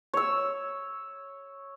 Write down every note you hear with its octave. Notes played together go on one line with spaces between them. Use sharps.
C#5 E6